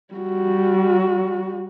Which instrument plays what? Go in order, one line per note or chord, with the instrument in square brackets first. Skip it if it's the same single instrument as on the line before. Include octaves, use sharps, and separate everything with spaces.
[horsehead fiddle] G3 F#4